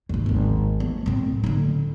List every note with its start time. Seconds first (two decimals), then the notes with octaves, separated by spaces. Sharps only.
0.09 A1 D#2
0.26 G#1 D#2
0.80 B3
1.06 A2 C4
1.44 D3 D#4